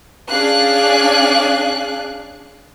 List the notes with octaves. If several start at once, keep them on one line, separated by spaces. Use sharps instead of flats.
C#4 D4 G#4 D5 F5 F#6